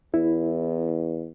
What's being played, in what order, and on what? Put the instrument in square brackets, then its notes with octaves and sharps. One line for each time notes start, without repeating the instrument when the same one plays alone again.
[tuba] E2 [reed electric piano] E4